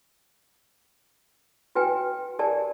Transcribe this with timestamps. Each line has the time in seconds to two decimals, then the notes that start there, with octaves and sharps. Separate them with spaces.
1.75 F#4 B4 G5 G#5
2.39 G4 A#4 D5 G#5 A5